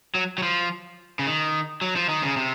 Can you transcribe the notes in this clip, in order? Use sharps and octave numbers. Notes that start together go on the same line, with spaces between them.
F#3
F#3
F3
C#3
D#3
F#3
F3
D#3
C#3
C3